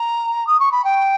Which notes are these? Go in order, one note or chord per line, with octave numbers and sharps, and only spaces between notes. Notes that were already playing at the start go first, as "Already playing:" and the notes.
Already playing: A#5
D#6
C#6
B5
G5